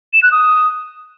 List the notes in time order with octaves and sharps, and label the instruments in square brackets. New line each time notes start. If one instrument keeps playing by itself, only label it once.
[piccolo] E7
F#6
D#6